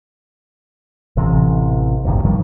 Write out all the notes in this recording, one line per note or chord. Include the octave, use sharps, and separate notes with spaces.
A1 C3 E3
D1 G#1 G2 D#3
G#2 D#3 F3 G3